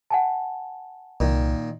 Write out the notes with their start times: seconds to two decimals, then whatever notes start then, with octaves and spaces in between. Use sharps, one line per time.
0.10 F#5 G#5 A5
1.20 C2 A#2 D#3